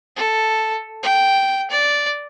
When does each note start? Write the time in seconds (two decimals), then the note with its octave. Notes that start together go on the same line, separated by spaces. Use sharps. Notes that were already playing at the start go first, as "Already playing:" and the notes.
0.16 A4
1.03 G5
1.70 D5